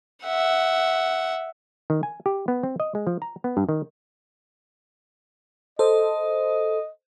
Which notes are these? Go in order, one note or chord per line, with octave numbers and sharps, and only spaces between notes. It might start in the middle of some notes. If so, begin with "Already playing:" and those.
E5 F#5
D#3
G#5
G4
B3
C4
D#5
G#3
F3
A#5
B3
G2
D#3
A4 C5 D#5